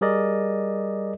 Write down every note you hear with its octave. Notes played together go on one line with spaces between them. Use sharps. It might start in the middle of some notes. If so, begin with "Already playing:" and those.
G3 G#4 A#4 D5 D#5